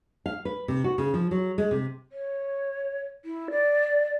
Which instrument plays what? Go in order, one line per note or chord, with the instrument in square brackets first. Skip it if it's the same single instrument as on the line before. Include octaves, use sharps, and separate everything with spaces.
[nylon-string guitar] F5
B4
C3
F#4
C#3
F3
F#3
G#3
C3
[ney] C#5
E4
D5